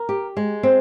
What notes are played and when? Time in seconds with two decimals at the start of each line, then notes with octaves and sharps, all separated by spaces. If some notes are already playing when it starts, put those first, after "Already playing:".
Already playing: A#4
0.09 G4
0.37 G#3
0.63 C4